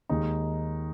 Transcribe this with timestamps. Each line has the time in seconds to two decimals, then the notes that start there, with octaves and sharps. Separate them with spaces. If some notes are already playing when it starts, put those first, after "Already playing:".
0.09 D#2 D#3 G#3 D#4